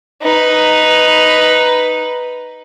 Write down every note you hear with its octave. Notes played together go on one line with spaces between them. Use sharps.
D#4 B4